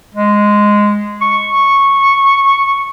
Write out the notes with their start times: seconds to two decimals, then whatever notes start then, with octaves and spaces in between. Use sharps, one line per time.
0.15 G#3
1.22 C#6